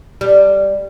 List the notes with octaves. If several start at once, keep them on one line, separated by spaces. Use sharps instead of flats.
G3